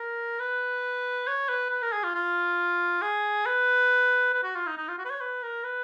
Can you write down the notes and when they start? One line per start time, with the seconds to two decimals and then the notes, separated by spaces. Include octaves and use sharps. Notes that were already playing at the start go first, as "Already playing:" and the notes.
Already playing: A#4
0.39 B4
1.28 C#5
1.49 B4
1.71 B4
1.82 A#4
1.93 G#4
2.04 F4
2.15 F4
3.02 G#4
3.46 B4
4.34 B4
4.44 F#4
4.55 F4
4.67 D#4
4.77 D#4
4.88 F4
4.98 F#4
5.05 B4
5.10 C#5
5.21 B4
5.43 A#4
5.64 B4